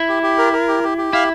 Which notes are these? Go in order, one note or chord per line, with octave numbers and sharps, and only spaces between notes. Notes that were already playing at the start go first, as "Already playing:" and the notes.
Already playing: E4
G4
G4
A#4
A#4
G4
G4
G4
E4 F5